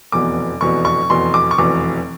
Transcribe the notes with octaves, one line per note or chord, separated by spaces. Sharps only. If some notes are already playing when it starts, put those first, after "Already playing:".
F1 E2 B2 D6
F1 E2 B2 C#6
C#6
F1 E2 B2 C6
D6
C#6
F1 E2 B2 D6